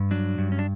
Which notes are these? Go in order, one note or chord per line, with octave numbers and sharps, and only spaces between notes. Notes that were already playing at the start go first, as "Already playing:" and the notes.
Already playing: G2
F#3 D4
G2
C#4
D4